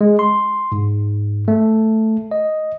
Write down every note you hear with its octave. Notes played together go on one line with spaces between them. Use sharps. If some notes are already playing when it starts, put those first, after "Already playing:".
G#3
C6
G#2
A3
D#5